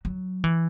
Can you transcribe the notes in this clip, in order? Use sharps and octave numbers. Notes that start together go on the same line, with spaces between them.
F#3
E3